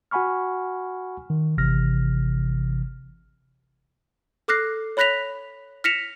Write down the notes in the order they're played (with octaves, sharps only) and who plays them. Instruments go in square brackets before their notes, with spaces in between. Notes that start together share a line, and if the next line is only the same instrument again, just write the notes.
[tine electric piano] F#4 F#5 G#5 B5 C#6 F6
D#3
G#1 C3 E3 F6 A#6
[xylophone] A4 D6 F6 F#6 A#6 C7
C#5 B5 F#6 A#6 B6 F7
F6 A#6 B6 C#7 E7 F7